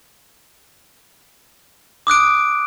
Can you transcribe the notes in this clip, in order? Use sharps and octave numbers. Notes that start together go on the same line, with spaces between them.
D6 D#6 F#6 D7